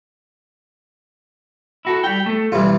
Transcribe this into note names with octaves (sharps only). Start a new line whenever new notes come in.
E4 F#4 A4
G3 G5
A3 A4
B1 E3 G3 F4